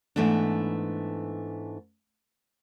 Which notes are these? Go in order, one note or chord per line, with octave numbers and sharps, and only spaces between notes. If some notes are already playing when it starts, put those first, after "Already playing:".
G#2 E3 A3 B3 D4